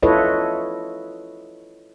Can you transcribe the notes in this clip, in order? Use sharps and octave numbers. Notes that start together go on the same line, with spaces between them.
E4 F4 A4 B4 C#5 D#5